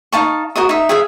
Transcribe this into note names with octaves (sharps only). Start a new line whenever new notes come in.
D#4 F5 A5 C#6
F#4 A#4 D#5 D#6
D#4 E5
G#4 E5 F5